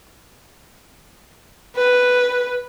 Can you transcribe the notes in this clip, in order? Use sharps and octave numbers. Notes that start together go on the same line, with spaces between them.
B4